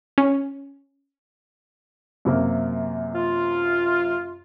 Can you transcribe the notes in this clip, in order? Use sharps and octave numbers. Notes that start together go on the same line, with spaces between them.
C#4
F#2 C3 A#3
F4